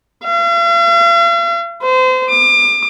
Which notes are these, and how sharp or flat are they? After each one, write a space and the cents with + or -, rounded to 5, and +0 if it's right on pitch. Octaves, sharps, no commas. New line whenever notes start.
F5 -45
C5 -30
D6 +35